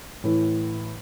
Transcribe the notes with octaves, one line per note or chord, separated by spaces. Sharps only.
A2 E3